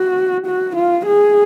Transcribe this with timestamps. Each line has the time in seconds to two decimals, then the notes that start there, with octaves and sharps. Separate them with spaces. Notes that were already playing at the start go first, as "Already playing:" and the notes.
Already playing: F#4
0.47 F#4
0.76 F4
1.05 G#4